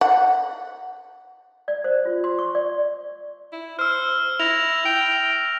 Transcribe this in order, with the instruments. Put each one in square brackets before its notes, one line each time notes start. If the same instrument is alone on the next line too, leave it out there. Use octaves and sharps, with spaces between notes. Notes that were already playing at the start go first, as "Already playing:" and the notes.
[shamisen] F#5
[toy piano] D5
C5
F4
C6
C#6
D5
[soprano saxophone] E4
[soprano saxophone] C5 [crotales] E6 F6
[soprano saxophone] E4 [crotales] A#6 F7
[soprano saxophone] G5